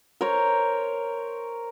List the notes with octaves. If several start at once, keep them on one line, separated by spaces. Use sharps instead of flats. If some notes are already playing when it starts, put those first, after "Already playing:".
A#4 C5 C#5